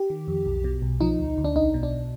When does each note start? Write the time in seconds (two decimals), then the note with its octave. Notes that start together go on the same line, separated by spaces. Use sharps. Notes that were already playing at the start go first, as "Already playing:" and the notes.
Already playing: G4
0.10 D#3
0.28 F2
0.46 B1
0.64 B2
0.82 B1
1.01 F3 D#4
1.19 D2
1.38 D2
1.44 D4
1.55 B1 D#4
1.74 B2
1.83 D4